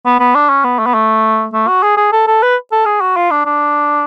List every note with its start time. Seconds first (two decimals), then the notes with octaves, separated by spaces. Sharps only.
0.06 B3
0.20 B3
0.35 D4
0.49 C#4
0.64 B3
0.79 A3
0.86 B3
0.94 A3
1.53 A3
1.68 F#4
1.83 G#4
1.97 G#4
2.12 A4
2.27 A4
2.42 B4
2.72 A4
2.86 G#4
3.01 F#4
3.16 F4
3.31 D4
3.46 D4